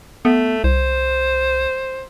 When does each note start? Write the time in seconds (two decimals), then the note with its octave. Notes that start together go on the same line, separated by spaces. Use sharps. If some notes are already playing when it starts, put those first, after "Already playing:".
0.25 A3 B3
0.64 C2 C5